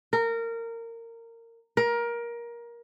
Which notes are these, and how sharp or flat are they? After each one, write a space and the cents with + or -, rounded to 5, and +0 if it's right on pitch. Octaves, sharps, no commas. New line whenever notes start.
A#4 -20
A#4 +20